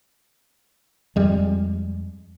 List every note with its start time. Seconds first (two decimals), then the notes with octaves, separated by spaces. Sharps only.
1.16 F2 G3 G#3